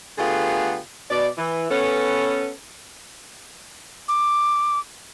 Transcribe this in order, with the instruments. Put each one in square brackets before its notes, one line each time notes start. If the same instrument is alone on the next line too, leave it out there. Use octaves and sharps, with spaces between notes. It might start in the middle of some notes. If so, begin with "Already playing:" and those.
[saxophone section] D3 A3 B3 F4 G4 G#4
B2 D5
E3
B3 C#4 A4
[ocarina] D6